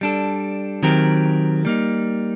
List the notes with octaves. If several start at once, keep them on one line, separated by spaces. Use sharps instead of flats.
G3 D4 A4
D#3 F#3 C4 G4 A#4
G3 A#3 D#4